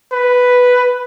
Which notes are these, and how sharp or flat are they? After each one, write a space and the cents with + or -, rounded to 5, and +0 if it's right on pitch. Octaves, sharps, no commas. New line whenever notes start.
B4 +0